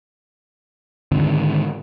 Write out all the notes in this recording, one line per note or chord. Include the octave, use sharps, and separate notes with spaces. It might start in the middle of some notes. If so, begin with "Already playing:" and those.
G#2 D3 D#3 C4